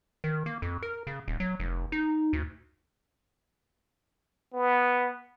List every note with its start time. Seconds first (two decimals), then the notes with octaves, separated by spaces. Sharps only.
0.24 D#3
0.46 A#3
0.62 F2
0.83 A#4
1.07 C#3
1.28 D#1
1.40 F#3
1.60 F1
1.92 D#4
2.33 D2
4.53 B3